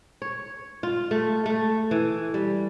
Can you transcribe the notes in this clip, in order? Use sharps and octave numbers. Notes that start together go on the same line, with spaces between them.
C#5
F4
A3
A3
E3
G3